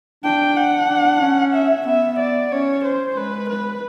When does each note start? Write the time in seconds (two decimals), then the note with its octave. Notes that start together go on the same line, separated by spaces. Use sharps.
0.24 D4 G5
0.57 F#5
0.89 D4
1.22 C#4
1.54 E5
1.87 B3 E5
2.19 D5
2.52 C#4 C#5
2.85 C5
3.17 G#3 B4
3.50 B4